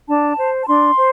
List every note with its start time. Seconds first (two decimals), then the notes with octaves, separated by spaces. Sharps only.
0.09 D4 A5
0.38 C5
0.62 A5
0.68 D4 C6
0.97 C5